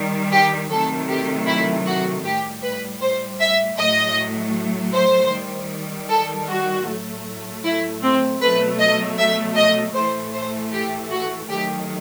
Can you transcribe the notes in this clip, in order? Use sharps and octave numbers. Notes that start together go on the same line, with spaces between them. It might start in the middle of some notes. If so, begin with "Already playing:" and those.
Already playing: D#3 G3
G4
C3 D#3 F#3 A3 A4
G4
E4
F#4
A2 G3 G4
B4
C5
E5
A2 F#3 A3 D#5
C5
D#3 G3
A4
F#4
A2 F#3 A3
E4
C4
B2 F#3 A3 B4
D#5
E5
D#5
A2 E3 A3 C5
C5
G4
F#4
D#3 F#3 A3 G4